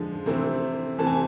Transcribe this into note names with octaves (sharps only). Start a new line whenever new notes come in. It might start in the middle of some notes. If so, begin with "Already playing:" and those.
Already playing: D3 F3 G#3
C3 E3 A3 C4
C3 E3 A3 C4 A5
G#5